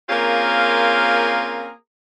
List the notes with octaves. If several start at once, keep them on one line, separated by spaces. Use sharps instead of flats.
A#3 C4 C#4 F4 G#4 A#4